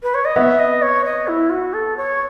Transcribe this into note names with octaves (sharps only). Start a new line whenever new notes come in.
B4
C#5
D#5
B3 E5
D#5
C#5
D#5
E4
F#4
A4
C#5